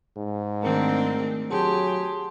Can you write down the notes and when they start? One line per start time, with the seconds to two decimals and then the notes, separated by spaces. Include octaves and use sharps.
0.17 G#2
0.62 D#3 A3 C4 D4 A#4
1.51 F#3 G4 G#4 A5 C6